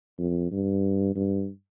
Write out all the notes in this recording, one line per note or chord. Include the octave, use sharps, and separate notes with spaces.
F2
G2
G2